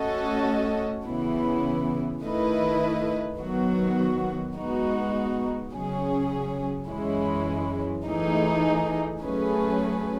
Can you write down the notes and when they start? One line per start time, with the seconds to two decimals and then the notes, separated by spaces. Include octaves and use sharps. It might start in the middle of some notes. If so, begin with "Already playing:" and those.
Already playing: A3 C#4 F#4 A4 D#5
1.05 C#3 E3 B3 E4
2.22 D#3 A3 E4 B4 D#5
3.39 D#3 F#3 B3 F#4
4.56 G#3 B3 D#4 F#4
5.72 C#3 F#3 C#4 G#4
6.88 F#2 E3 G#3 C#4 E4
8.06 E3 A3 D#4 G#4
9.23 F#3 A3 C#4 G#4 B4